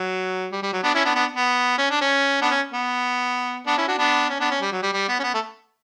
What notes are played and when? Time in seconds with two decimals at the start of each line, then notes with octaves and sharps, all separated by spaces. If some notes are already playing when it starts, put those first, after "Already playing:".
Already playing: F#3
0.52 G3
0.63 G3
0.73 F#3
0.83 B3 D4
0.94 C#4 E4
1.05 B3 D4
1.15 B3 D4
1.36 B3
1.78 C#4
1.90 D4
2.01 C#4
2.41 B3 D4
2.51 C#4
2.73 B3
3.67 B3 D4
3.77 C#4 E4
3.88 D4 F#4
3.98 B3 D4
4.30 C#4
4.40 B3 D4
4.50 C#4
4.61 G3
4.72 F#3
4.83 G3
4.93 G3
5.08 B3
5.19 C#4
5.23 B3
5.34 A3